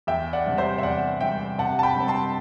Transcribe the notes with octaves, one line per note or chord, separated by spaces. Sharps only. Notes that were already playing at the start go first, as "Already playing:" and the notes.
E2 E5 G5
D5 F#5
C3 G3
C5 E5
E5
E2 D5 F#5
C3 G3 E5 G5
C3 F#5 A5
A5
G5 B5
G3 C4
A5 C6